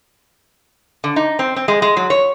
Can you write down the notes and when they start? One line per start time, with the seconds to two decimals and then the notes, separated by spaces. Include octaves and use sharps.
1.04 D3
1.16 D#4
1.39 C4
1.56 C4
1.68 G#3
1.82 G#3
1.97 F#3
2.10 C#5